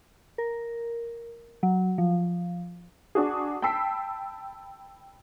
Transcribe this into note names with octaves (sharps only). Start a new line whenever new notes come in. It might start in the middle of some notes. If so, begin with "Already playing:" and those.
A#4
F#3
F3
D4 F#4 G#4
G5 A5 B5 E6 B6 C7